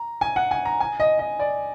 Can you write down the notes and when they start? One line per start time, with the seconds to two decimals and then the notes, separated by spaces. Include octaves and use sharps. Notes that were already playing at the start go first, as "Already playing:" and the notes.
Already playing: A#5
0.21 G#5
0.36 F#5
0.51 G#5
0.65 A#5
0.80 G#5
1.00 D#5
1.19 D#5
1.40 D5